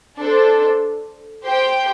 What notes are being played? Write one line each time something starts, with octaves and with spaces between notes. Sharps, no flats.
D4 A4 C5
G4 C5 G5